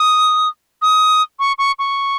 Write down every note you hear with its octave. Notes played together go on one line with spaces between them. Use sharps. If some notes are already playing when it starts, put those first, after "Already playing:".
Already playing: D#6
D#6
C#6
C#6
C#6